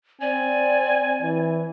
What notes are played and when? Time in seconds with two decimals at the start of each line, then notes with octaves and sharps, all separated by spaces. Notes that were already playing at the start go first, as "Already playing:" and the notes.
0.21 C4 D5 G#5
1.22 E3